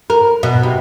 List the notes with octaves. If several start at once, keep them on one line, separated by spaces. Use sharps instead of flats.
A#4
B2
C3